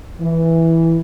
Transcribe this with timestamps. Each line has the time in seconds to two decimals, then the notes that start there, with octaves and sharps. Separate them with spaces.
0.20 E3